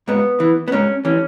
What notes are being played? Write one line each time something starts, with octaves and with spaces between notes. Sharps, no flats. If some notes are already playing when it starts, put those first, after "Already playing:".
G#2 B3
E3
B3
G#2 C#4
E3 C#4